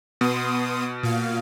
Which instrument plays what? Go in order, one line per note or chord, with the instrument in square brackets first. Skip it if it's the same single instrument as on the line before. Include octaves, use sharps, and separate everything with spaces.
[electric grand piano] B2 [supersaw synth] B3 C6 D#6
[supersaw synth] A#2 F5